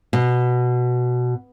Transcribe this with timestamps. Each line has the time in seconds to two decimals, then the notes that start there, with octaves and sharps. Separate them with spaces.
0.13 B2